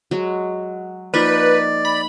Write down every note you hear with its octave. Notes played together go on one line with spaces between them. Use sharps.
F#3 G#3
F3 A#3 D#4 B4 D5
B5